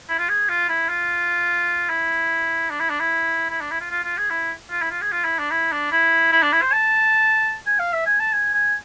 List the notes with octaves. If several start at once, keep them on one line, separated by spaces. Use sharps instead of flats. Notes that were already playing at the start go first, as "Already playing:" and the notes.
E4
F4
G#4
F4
E4
F4
E4
D4
E4
D4
E4
E4
D4
E4
F4
F4
F4
G#4
E4
F4
E4
F4
G#4
F4
E4
D4
E4
D4
E4
E4
D4
E4
C5
A5
G#5
F5
E5
G#5
A5
G#5
G#5